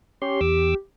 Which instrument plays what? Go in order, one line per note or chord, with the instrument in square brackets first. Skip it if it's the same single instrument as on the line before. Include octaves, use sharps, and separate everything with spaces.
[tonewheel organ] C#4 C#5 C6 [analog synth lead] G4
[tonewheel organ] E2 D6 E6